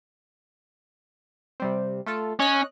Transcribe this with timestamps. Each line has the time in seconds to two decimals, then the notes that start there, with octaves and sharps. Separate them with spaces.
1.60 C3 G3 C4
2.06 A3 F4 A4
2.40 C#4 D#5 F#6